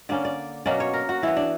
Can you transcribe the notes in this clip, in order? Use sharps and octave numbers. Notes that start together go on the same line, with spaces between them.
D3 A#3 C#4 D5
D5
B2 F#3 A#3 C#4 D5
C#5
A#4
F#4
E3 B3 E4
D4